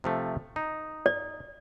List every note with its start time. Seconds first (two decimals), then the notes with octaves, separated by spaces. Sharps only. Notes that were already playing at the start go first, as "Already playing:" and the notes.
0.04 C3 F3 A3
0.56 D#4
1.06 D5